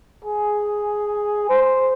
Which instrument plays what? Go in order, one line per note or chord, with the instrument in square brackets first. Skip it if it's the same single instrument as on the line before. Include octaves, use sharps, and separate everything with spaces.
[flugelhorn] G#4
C5